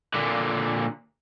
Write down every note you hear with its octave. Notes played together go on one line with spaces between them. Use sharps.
A#2 D3